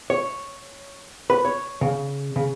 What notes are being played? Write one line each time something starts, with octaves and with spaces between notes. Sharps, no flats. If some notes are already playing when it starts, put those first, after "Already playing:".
C#5
B4
C#5
C#3
C#3